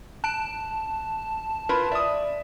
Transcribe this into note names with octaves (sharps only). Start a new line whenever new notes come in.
A5 F#6 D7
E4 F4 A#4 B4
D5 E5 D#6